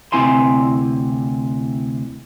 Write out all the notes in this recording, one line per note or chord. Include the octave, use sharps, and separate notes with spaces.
D2 C3 C4 E4 G#5 C6